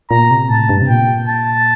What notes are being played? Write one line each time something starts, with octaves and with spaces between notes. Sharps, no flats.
A#2 A#5
C3
A2 A5
G2
C3
A#2 G5
A5